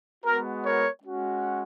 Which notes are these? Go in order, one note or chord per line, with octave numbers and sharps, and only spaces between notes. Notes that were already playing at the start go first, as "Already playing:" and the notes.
G#3 B3 F#4 A#4
A#4 C#5
G#3 C#4 F#4